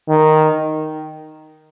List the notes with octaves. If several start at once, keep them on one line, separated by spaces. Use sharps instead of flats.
D#3